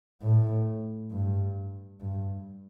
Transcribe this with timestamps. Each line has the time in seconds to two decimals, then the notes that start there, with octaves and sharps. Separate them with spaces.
0.22 A2
1.11 G2
2.00 G2